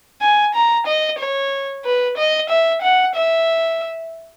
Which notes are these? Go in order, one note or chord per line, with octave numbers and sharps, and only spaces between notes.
G#5
A#5
D#5
C#5
B4
D#5
E5
F#5
E5